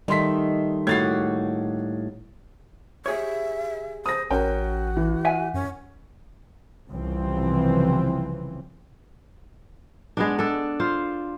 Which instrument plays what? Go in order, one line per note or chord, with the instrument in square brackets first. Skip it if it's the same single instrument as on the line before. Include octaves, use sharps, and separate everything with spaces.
[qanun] D#3 A3 [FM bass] G3 [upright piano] D#4 C6 B6
[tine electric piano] A2 [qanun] A#3 D#4 F#4 [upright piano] G#6 A6 C7
[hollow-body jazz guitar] G4 G#4 C#5 [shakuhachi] E5
[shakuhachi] C5 [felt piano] D#6 A#6
[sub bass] A1 [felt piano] C#4 A#4 G5 [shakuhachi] F#4
[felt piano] E3
[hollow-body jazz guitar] E5 F#5 G#5
[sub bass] F#2 [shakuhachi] C#4
[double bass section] C2 C#3 E3 F3 C4
[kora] G#3 B3 D4
D4 A4
F4 C5